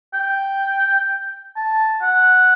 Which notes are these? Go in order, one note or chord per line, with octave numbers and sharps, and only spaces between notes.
G5
A5
F#5